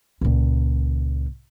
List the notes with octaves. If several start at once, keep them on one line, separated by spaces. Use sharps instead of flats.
C#2 A#2